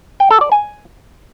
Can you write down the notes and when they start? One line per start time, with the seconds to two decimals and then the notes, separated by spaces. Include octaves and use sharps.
0.20 G5
0.31 A4
0.41 D5
0.52 G#5